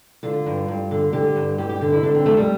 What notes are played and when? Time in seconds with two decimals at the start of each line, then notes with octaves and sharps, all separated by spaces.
0.23 D3 F4
0.46 G2
0.68 G2
0.91 D3
1.13 D3 G4
1.36 G2
1.58 G2 G4
1.69 G4
1.81 D3
1.92 E4
2.03 D3 D4
2.15 C4
2.26 F2 A3
2.37 G3